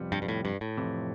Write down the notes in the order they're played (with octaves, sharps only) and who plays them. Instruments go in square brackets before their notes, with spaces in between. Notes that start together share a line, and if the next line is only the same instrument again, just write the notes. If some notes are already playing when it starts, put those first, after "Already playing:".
Already playing: [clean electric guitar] F2 C3 G3 B3
[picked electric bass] G2
G2
A2
G2
A2
[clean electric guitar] F2 C3 E3